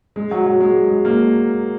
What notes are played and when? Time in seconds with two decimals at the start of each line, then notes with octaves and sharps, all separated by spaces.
0.16 G#3
0.31 F#3
0.46 F#3
0.61 G#3
0.90 G#3
1.05 A#3